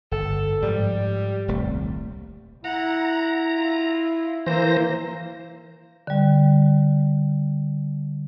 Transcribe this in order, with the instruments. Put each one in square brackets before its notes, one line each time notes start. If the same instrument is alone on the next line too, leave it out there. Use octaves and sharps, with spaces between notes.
[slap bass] G1 [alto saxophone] A4
[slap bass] G#2 F3 [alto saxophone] G3
[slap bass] D#1 C2 A3
[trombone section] E4 [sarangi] F#5 [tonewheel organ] A#5
[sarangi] F4
[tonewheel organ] E3 C5 A#6 [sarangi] A#3
[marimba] D3 G3